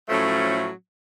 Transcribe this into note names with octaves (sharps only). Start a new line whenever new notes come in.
A2 F3 F#3 A3 C#4